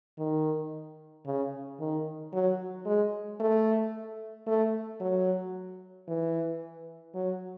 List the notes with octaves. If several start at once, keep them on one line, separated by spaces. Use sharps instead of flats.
D#3
C#3
D#3
F#3
G#3
A3
A3
F#3
E3
F#3